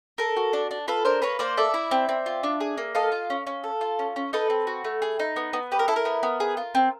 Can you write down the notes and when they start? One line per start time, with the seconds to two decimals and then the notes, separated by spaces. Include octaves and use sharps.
0.18 A4 A#4
0.37 F#4
0.53 D4
0.71 D4
0.88 F4 A4 B4
1.05 D4 A#4 C5
1.22 A#3 B4 C#5
1.39 A#3 C5 D5
1.57 A4 D5 E5
1.74 E4
1.91 C4
2.09 C4
2.26 F4
2.43 D4
2.60 G#4
2.78 A#3
2.95 A4 D#5 F5
3.12 F4
3.30 C#4
3.47 C#4
3.64 A4
3.81 F4
3.99 C#4
4.16 C#4
4.33 D#4 A4 B4
4.50 C4
4.67 F#4
4.84 A3
5.02 G#4
5.19 D#4
5.36 B3
5.53 B3
5.72 G4 B4
5.79 A#4
5.88 E4 A4
5.96 A#4
6.05 B3
6.23 B3
6.40 G#4
6.57 F4
6.75 C4